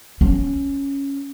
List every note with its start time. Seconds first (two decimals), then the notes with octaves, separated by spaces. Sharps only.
0.21 C#4